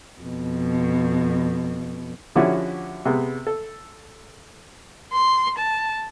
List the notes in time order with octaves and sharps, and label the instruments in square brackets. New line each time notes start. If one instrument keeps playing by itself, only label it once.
[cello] F2 B2
[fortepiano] D3 F3 C#4 E4 F#4 G4
C3 G#3 B3
A4
[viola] C6
A5